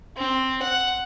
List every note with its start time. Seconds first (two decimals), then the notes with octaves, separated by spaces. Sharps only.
0.17 C4
0.62 F#5